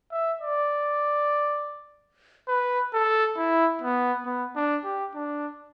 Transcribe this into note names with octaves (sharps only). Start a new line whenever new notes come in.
E5
D5
B4
A4
E4
B3
B3
D4
G4
D4